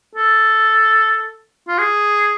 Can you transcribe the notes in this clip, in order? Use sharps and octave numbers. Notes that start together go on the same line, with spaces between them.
A4
F4
G#4